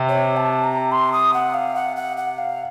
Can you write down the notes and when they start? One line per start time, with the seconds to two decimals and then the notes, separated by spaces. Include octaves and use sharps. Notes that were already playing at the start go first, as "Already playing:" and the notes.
Already playing: C3
0.09 C#5
0.37 A5
0.64 A#5
0.92 C6
1.13 D#6
1.34 F#5
1.54 F5
1.75 F#5
1.96 F#5
2.17 F#5
2.38 F5